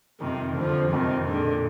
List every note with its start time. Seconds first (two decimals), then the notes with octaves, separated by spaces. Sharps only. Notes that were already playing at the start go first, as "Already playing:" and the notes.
0.20 F2 C3 D#3
0.56 F2 D3 F3
0.92 F2 C3 D#3
1.27 A#2 D3 G#3